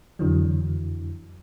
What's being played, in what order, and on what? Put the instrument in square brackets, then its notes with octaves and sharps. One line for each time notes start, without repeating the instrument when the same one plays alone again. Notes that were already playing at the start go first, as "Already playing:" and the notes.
[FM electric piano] F2 D3 E3 F#3